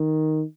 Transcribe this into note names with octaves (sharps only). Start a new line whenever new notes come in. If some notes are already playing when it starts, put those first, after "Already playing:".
Already playing: D#3